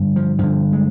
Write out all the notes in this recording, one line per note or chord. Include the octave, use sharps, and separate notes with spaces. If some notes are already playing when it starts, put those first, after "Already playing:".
Already playing: G2 D3
F3
G2 D3 F3
G#3